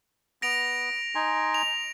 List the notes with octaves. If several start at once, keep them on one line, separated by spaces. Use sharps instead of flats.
B3 A#6 D7 F7
D#4 G#5 C6
F7